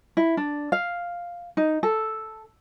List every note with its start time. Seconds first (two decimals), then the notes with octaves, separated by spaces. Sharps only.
0.17 E4
0.37 D4
0.72 F5
1.57 D#4
1.83 A4